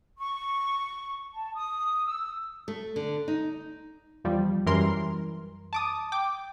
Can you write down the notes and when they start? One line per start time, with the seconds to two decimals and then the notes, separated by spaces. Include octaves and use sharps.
0.18 C#6
1.33 A5
1.54 D#6
2.06 E6
2.68 A3
2.96 D3
3.28 D#4
4.24 E2 F3 G3
4.66 F#2 E3 G3 A#4 C6
5.73 A5 D6 D#6
6.12 G5 D6